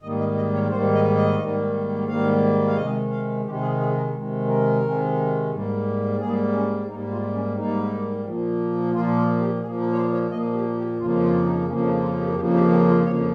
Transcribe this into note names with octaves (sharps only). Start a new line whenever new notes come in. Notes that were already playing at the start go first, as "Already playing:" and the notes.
G#2 D#3 G3 A#3 D#5
D#5
D#5
C#5
G#2 D#3 G3 A#3 C5
D#5
D#5
G#2 D#3 G3 A#3
G#2 D#3 G3 A#3 F5
F5
C3 D#3 G#3 D#5
F5
C3 D#3 G#3 G4
G#4
G#4
A#4
C3 D#3 G#3
A#4
C3 D#3 G#3
G#2 G3 A#3
G#2 G3 A#3 G#4
C#4
G#2 G3 A#3 D#4
F4
C#4
G#2 G3 A#3 D#4
A#2 F3 A#3
A#2 F3 A#3 F4
F4
G4
A#2 F3 A#3 G#4
A#4
C#5
C5
C#5
A#2 F3 A#3 D#5
G4
G4
F2 C#3 F3 A#3 F4
F4
D#4
F2 C#3 F3 A#3 C#4
D#4
F4
G4
F2 C#3 F3 A#3 G4
G4
G4
F4
F2 C#3 F3 A#3 C#5